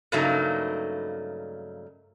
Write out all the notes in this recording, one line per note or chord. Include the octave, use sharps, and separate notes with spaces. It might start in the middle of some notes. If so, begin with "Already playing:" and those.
G2 C#3 F#3 A3 A#3 D#4